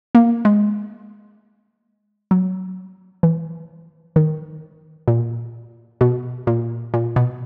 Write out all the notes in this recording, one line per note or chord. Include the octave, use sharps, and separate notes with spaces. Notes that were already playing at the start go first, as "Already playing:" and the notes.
A#3
G#3
F#3
E3
D#3
A#2
B2
A#2
A#2
B2